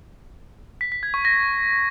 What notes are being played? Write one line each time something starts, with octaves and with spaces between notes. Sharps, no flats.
B6
B6
G#6
C#6
A#6